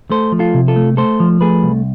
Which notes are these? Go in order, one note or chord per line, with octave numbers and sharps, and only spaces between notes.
A3 A4 C5
F3
F4 A4
C3
F4 A4
A3
A3 A4 C5
F3
A3 G#4 B4
C2